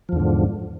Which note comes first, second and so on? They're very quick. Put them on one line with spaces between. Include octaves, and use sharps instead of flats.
F3 E2 D3 G#2